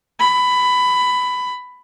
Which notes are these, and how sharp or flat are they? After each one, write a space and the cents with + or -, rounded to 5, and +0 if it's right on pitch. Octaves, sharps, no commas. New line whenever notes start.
B5 +15